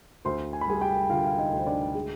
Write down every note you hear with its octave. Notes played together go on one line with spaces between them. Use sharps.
D2 C5 C6
G#5
B5
G3 G#4 G#5
G4 G5
D3 F4 F5
F5
D#4 D#5
D2
C5
D4 D5
G#3 G#4